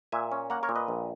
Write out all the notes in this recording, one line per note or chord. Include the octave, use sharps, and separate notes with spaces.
A#2 E5 G#5
C#4
A#3 F#5 A#5
A#4 C#5
A#2
B4 D#5
A#1